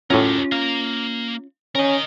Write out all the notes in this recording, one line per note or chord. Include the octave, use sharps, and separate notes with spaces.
A2 F#3 C#4 F4 G4 A#4
A#3 F5 A#5
C#4 A#4 D#5